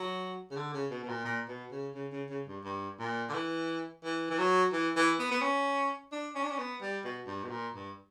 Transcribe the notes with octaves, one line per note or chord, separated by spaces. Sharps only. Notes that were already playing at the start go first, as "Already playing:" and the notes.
Already playing: F#3
C#3
D3
C#3
B2
B2
A#2
A#2
B2
C#3
C#3
C#3
C#3
G2
G2
A#2
D3
E3
E3
E3
F#3
E3
E3
B3
B3
C#4
D4
C#4
D4
C#4
B3
G3
B2
G2
B2
A#2
G2